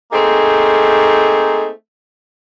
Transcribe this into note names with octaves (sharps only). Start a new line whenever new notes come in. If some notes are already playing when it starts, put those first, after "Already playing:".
A3 A#3 C4 D#4 G#4